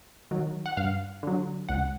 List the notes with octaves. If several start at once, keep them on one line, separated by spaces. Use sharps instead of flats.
D#3 F#3
F#5
G2 F5
D3 F#3
C#2 F#5